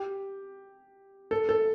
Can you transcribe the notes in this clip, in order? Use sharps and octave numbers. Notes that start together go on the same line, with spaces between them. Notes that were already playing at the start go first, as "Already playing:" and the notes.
Already playing: G4
A4
A4